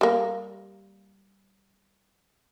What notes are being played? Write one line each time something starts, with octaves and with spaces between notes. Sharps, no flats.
G3 A#3